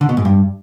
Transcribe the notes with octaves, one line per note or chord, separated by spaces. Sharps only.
D3
B2
G#2
G2